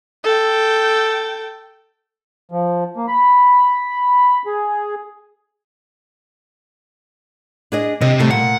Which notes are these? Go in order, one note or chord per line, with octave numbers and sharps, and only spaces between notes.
A4 G5
F3
A#3
B5
G#4
D4 G#4 D#5
C3 D#5
G3 A3
A#2 F#5